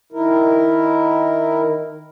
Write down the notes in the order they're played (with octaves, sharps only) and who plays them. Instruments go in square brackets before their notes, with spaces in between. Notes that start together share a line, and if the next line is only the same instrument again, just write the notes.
[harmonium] D#3 E4 A#4